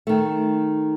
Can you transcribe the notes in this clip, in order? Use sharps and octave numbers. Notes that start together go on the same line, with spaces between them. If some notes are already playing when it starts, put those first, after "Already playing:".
D#3 A3